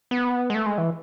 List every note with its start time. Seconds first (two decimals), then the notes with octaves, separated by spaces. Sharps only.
0.11 B3
0.50 G#3
0.55 A3
0.66 G#3
0.78 E3